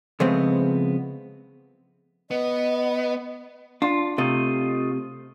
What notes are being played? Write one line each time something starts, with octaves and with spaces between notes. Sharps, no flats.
C#3 F3 G#3 A3 B3 C4
B3 D#5
D4 F4
C3 A3 F4 D#5